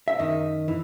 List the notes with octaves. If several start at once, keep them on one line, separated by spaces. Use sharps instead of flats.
E5
F#2 D#3 D#5
E3